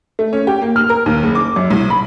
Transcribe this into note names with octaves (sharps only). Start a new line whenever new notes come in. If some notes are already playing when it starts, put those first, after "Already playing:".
A3
C#4
G4
A#3
F6
A#4
D#2
F#1
D6
F#2
C2
B5